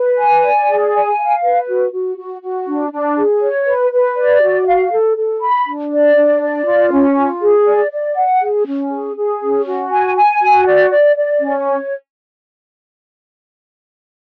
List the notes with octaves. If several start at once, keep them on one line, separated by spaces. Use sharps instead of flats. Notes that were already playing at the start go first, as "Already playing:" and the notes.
Already playing: B4
G#5
D5
G#4
G#5
F5
B4
F#4
F#4
F#4
F#4
D4
D4
G#4
C#5
B4
B4
D5
F#4
F5
A4
A4
B5
D4
D5
D4
D5
F4
C#4
F4
G#4
D5
D5
F#5
G#4
C#4
G#4
G#4
C#4
F#4
G#5
G#5
F#4
D5
D5
D5
C#4
C#5